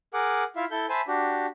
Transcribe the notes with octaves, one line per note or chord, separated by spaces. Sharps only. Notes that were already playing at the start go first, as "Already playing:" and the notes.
G#4 A#4 F#5 D6
E4 F4 E5 F5
E4 A4 G6
C5 E5 G#5 A5 B5
D4 F#4 G4